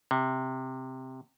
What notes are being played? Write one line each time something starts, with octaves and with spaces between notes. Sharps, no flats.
C3